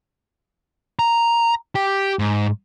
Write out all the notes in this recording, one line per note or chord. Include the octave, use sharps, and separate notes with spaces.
A#5
G4
G#2